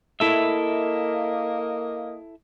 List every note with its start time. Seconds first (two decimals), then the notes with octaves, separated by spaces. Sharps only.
0.20 A#3 E4 A4 D#5 E5